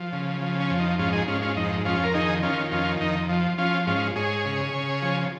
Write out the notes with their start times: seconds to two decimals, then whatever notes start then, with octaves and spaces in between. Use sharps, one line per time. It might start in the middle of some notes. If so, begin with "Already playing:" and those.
Already playing: F3
0.13 C#3
0.41 F3
0.60 C#4
0.70 F2
0.80 D#4
0.99 G#2 C#4 F4
1.13 D#4 G#4
1.27 G#2 C#4 F4
1.42 C#4 F4
1.56 F2 D#4
1.85 F2 C#4 F4
2.03 A#4
2.14 D#3 D#4 G#4
2.43 D#3 C#4 F4
2.71 F2 C#4 F4
3.00 F2 D#4
3.29 F3
3.58 F3 C#4 F4
3.87 G#2 C#4 F4
4.16 G#2 G#4 C#5
4.45 C#3
4.73 C#3
5.02 F3